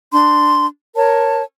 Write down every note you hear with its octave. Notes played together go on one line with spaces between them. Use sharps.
D4 C6
A#4 C#5 A5